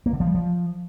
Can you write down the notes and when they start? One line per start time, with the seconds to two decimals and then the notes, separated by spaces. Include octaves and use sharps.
0.06 A#3
0.13 D3
0.20 F3
0.27 G3
0.35 F3